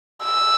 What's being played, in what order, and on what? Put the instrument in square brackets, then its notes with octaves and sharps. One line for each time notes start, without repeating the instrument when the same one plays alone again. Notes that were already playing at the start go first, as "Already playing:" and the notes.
[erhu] E6